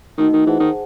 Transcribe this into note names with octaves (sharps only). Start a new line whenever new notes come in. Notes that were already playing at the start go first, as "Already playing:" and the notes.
D#3 A3 D#4 F#4
D#3
E3 G#4 C5 F#5 A5
D#3